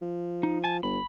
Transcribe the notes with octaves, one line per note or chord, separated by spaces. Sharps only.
F3
D#4
G#5 A5
G1 B5